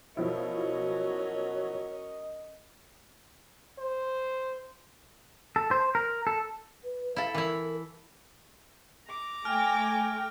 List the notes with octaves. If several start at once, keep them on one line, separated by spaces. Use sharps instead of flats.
B2 F3 F#3 C#4 E4 A#4 D#5
C5
A4
C5
A#4
A4
B4
E4 A4 F5
E3 E4 A#4
A#5 D6
A3 G5 G#5 F6